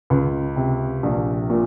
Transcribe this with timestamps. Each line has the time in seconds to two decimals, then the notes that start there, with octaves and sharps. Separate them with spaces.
0.10 C#2
0.56 C3
1.03 A#1
1.50 A#2